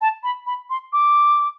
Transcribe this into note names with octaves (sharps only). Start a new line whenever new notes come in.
A5
B5
B5
C6
D6